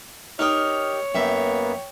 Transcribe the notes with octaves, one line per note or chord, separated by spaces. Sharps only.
D#4 G4 A#4 C#5 G5 D#6 F6
F#2 A#3 B3 E5 G5